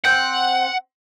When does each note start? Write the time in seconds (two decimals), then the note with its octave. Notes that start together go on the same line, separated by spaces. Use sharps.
0.05 C4 F#5 G5